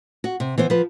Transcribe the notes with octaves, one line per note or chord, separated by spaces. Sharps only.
F#4
C3
E3 B3 C5
F3 B4